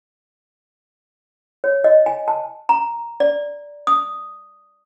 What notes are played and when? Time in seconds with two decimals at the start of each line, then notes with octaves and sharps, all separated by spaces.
1.64 C#5
1.84 D#5
2.06 G#5
2.28 A5
2.69 A#5
3.20 D5
3.87 D#6